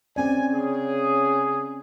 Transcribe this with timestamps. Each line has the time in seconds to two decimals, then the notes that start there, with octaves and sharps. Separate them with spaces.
0.16 C4 C#4 D5 G#5
0.53 C#3 G#4